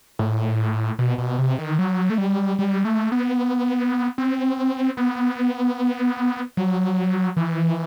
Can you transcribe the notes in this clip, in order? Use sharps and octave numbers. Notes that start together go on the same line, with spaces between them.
A2
B2
B2
C3
D#3
F#3
A3
G3
G3
A3
B3
C4
B3
F#3
E3